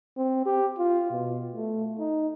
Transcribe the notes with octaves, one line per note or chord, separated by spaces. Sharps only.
C4
G4
F4
B2
A3
D#4